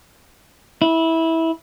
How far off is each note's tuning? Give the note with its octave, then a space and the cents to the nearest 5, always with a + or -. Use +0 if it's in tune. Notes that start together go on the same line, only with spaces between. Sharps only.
E4 -15